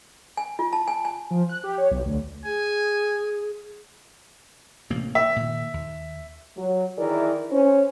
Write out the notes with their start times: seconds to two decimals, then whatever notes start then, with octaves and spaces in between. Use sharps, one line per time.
0.37 G#5
0.59 F4
0.73 A5
0.88 G#5
1.05 G#5
1.31 F3
1.49 F#6
1.64 G4
1.78 C#5
1.91 B1
2.05 D2
2.45 G#4 G#5
4.90 A1 C3 A#3
5.15 E5
5.36 A#2 D#3
5.74 D#2
6.57 F#3
6.98 D#3 E3 E4 G#4 A#4 D5
7.51 C#4 C5